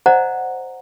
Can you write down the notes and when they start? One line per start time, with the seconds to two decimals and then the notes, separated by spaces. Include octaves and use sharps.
0.06 C5 D5 D#5 F#5 A#5